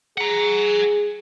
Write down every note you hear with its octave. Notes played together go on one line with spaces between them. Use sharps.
G#4 F#5 A#5